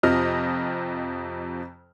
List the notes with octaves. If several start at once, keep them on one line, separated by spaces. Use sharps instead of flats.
F2 C3 F3 D#5 F6